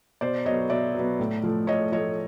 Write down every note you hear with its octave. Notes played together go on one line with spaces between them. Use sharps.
B2 C5 D5
F#3 B3 C#5 D#5
B2 D5 E5
F#3 B3
A2
F3 A3
A2 C#5 D#5
F3 A3 C#5 D#5